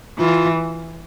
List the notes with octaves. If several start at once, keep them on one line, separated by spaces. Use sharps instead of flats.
E3 F4